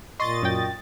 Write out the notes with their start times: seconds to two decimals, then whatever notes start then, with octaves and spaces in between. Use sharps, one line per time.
0.20 A#2 D#5 C6 C#6 A6
0.42 F#2 G5